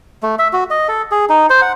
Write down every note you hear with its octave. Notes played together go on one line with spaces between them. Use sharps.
A3
E5
F#4
D#5
A4
G#4
D#4
C5
F#5